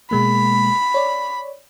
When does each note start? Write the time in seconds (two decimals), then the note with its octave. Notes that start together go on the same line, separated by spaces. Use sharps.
0.11 B2 G#3 A#3 B5
0.94 C#5 D5